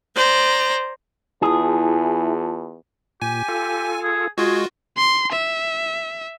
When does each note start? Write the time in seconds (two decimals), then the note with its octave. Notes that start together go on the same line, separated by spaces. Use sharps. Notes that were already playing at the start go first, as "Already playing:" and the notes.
0.16 C5 D5 A#5
1.42 E2 E4 F4 G#4 A5
3.22 A#2 G4 G#5
3.48 F4 A4
4.03 G#4
4.38 G#3 F4 F#4 G#4
4.97 C6
5.32 E5